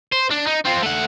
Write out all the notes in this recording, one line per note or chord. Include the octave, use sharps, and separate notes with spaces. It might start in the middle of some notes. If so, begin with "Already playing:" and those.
C5
D4
D#4
C4 F4
A3 F#5